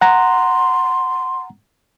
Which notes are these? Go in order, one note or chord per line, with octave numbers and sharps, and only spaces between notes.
F#5 A#5 C6